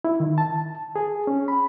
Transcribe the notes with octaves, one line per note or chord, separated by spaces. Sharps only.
E4
D#3
A5
G#4
C#4
B5